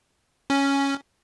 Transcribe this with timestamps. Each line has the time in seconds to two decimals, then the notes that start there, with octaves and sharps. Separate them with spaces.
0.50 C#4